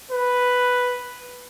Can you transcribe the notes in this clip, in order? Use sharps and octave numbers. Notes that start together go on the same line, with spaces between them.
B4